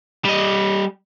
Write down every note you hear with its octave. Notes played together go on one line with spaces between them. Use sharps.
G3 D#5